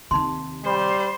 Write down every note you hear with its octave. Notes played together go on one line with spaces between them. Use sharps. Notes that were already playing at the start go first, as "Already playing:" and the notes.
D#2 C3 D#4 C6
G3 C5